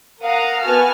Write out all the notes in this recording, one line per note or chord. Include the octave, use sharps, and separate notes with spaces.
A#4 F5 F#5 A#5 D#6
B3 F#4 G#5 A5 F6